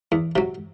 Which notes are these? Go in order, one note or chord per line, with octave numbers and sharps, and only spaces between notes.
E2
C3 F#3